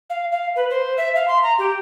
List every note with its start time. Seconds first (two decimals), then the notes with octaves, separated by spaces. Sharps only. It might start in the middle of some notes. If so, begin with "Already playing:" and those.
0.10 F5
0.32 F5
0.56 B4
0.70 C5
0.97 E5
1.16 F5
1.28 C6
1.43 A#5
1.58 G4